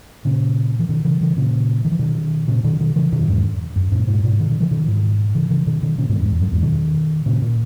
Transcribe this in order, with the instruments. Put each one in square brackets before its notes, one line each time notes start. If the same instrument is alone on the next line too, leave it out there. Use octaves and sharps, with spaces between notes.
[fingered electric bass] A#2 C#3
E3
B2 D#3
C#3 E3
C#3 E3
A#2 C#3
D#3
E3
B2 D#3
A#2 C#3
B2 D#3
B2 D#3
C#3 E3
B2 D#3
F#2
E2 G#2
F#2
F#2 A#2
G#2 B2
G#2 B2
B2 D#3
B2 D#3
C#3 E3
B2 D#3
G#2 B2
C#3 E3
C#3 E3
B2 D#3
B2 D#3
A#2 C#3
G#2 B2
E2 G#2
E2
F#2
E2 G#2
B2 D#3
A#2 C#3
A#2